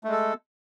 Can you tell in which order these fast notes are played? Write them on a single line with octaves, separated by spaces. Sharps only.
A3 G#3 A4